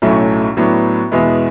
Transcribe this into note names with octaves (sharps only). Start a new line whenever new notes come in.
B1 A2 F#3 A3 C#4
A2 F#3 B3 D4
E2 B2 G#3 B3 E4